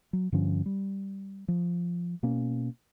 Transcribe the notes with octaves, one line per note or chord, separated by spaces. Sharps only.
F#3
G2 D3 F3 C#4
G3
F3
B2 A#3 C#4